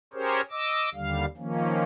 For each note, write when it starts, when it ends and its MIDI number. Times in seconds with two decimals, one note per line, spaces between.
0.14 0.41 61
0.14 0.41 67
0.14 0.41 68
0.14 0.41 70
0.14 0.41 72
0.14 0.41 73
0.51 0.90 75
0.51 0.90 86
0.51 0.90 88
0.94 1.25 39
0.94 1.25 50
0.94 1.25 55
0.94 1.25 77
1.37 1.84 51
1.37 1.84 53
1.37 1.84 58
1.37 1.84 61